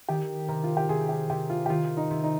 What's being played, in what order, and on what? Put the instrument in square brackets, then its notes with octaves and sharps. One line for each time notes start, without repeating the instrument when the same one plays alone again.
[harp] D#3 [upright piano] G4
[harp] C3 [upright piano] A#4
[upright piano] F4
G4
[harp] C3 [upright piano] G#4
[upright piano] G4
[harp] C3 [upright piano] G4
[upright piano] F4
G4
[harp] D#3 [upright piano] F4
[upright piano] D#4
[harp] C3
[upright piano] D#4